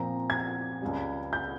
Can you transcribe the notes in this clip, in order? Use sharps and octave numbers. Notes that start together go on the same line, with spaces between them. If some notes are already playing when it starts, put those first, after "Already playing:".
Already playing: A#2 F3 C4 A#5
G#6
C#2 C#3 G3
G6